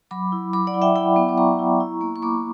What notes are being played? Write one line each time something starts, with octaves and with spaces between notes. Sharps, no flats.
F#3 B5 D6
E4
F#3 B5 D6
D5 F#5
E4
E5 G5
E4 G5 B5
B3
D6
B3 A#5 C#6
E4
E4
A#3
C#6
A#3 B5 D6